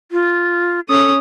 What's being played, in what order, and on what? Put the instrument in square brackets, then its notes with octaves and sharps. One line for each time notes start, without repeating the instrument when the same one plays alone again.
[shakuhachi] F4
[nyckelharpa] C#4 D#6 [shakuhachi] A4